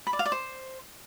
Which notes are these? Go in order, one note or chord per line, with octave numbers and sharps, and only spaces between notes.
B5
D5
F5
D5
C5